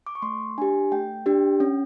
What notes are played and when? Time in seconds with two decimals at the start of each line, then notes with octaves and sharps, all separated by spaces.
0.07 D6
0.15 C#6
0.22 A3 C6
0.58 D4 G4 G#5
0.92 A3 G5
1.26 D4 G4
1.60 C#4